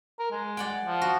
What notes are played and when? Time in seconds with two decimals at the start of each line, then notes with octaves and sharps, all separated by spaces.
0.19 A#4
0.31 G#3
0.57 D5 F#5 G5
0.85 F3
1.02 F#4